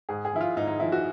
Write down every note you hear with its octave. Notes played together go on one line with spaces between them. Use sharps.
G#2 G#4
G#4
F3 E4
F4
G#2 D#4
D#4
F3 E4
F#4